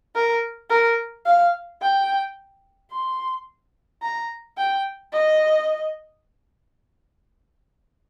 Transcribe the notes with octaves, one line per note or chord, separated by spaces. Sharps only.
A#4
A#4
F5
G5
C6
A#5
G5
D#5